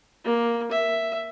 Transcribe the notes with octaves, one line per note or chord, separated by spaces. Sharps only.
A#3
E5